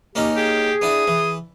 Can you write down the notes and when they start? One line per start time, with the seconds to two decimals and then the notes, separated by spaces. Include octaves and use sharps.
0.15 A#3 C#4 D#4 G4
0.36 G4 G#4
0.82 B3 D4 E4 D#6
1.07 E3